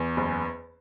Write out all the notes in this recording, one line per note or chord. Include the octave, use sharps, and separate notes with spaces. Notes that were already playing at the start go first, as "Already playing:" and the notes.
Already playing: E2
F#1